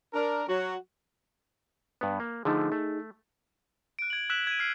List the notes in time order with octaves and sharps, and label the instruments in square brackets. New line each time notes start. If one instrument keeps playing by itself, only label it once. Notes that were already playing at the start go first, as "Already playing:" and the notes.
[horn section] D4 A#4
F#3 F#4
[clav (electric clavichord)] G2 B3
A#3
[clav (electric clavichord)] D3 F3 A3 [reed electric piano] D#4 G#4
[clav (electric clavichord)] A3
[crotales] F#6 D7
G#6 F#7
E6 F#6 G#6 B6 E7 F#7
G#6 D#7
F6 C7 D7 D#7